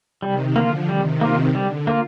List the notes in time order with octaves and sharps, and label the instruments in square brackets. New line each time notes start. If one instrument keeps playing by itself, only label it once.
[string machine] C3 D#3 [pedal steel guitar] G3
[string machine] D3 F3 [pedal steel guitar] A#3 F4
[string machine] C3 D#3 [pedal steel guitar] G3
[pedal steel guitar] A#3 F4
[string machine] D3 [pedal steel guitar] G3
[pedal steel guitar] A#3 F4